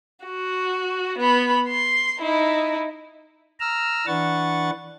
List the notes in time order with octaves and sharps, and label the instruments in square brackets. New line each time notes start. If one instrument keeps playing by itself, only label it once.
[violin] F#4
B3 B5
C6
D#4 E4
[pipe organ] A#5 E6 F6
E3 D4 B4 F#5 C#6 A6